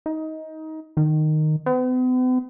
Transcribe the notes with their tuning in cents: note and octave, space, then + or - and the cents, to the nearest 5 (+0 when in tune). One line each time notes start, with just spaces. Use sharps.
D#4 +20
D#3 -15
B3 +45